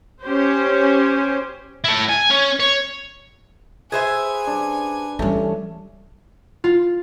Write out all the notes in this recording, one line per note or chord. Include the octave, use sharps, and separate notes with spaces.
C#4 G4 C5
E4 A4
G#5
C#4
C#5
G#4 B4 C5 E5 G#5
G3 D4
E3 G3 A3 C#4
F4